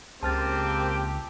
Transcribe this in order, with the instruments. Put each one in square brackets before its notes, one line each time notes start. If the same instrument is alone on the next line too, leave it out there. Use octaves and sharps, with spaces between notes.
[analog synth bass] C#2 [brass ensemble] C#3 A#3 C4 [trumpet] G4 [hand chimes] A5 F6 A6